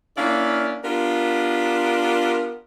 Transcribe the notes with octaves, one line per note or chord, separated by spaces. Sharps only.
A#3 C#4 D4 E4 D5 F5
B3 D4 F4 G4 A#4